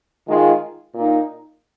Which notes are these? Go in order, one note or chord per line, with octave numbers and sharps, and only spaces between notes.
D#3 G#3 F4
A#2 A#3 D#4